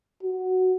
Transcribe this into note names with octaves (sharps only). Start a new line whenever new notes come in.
F#4